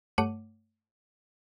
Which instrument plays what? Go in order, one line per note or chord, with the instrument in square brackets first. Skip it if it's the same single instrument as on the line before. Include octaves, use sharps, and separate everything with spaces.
[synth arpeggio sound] G2 A3 C#5 F#5 D6 D#7